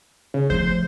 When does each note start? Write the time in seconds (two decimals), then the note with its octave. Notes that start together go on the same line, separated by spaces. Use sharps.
0.34 C#3
0.50 F3 A3 C5